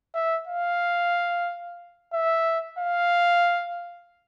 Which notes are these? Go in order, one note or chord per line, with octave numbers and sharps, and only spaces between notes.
E5
F5
E5
F5